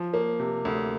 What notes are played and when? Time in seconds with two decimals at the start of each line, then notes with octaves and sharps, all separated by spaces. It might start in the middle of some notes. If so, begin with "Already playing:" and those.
Already playing: F3
0.14 A#3
0.40 C3
0.65 D2